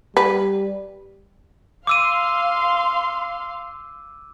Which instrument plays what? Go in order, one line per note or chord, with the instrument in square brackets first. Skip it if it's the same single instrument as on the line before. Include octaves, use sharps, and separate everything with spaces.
[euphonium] G3 [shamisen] B4
[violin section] F5 C6 [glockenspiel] D6 E6 D#7